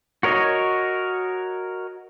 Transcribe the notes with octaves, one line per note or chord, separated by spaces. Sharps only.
F#4 A#4 C#5 D#5